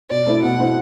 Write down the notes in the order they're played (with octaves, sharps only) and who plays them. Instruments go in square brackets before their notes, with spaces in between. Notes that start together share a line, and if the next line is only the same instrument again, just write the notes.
[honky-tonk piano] B2 [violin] D5
[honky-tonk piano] A3 C4 E4
[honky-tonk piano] B2 [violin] F#5
[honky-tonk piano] A3 C4 E4